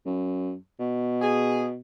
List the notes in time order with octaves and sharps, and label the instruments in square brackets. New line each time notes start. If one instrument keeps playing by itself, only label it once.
[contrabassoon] F#2
B2
[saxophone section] G#4